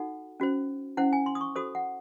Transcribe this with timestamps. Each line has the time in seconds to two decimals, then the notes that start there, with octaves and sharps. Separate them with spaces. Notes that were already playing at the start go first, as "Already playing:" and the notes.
Already playing: D#4 F#4 A4 F#5
0.40 C#4 F#4 C5
0.97 C#4 E4 C5 F#5
1.13 G#5
1.26 C6
1.35 D#6
1.41 C#6
1.56 F#4 A4 C5 D#6
1.75 F#5